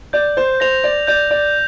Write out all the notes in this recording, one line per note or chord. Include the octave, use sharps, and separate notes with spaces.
D5 G6
C5
C5 A#6 F7
D5
D5 G6
D5